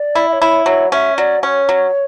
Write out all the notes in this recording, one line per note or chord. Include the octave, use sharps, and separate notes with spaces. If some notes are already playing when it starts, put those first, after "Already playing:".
Already playing: D5
E4
E5
C#5
E4
F#3 C#5
C#4 E5
F#3 D5
C#4 C#5
F#3